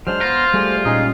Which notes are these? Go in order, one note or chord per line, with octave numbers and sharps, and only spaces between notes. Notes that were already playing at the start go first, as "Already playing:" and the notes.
F#3 G#3 D4 C5 F6
B3 F4 A#5
G3 A3 G#4 D5
A#2 G#3 C#4 D#4 G#4 D#6